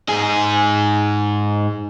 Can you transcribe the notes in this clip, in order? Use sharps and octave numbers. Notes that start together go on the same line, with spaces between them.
G#2 G#4